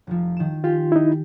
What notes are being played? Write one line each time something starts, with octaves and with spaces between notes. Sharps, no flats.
F1 F3
D#3 E7
F4 G4 G#4
D#4 E4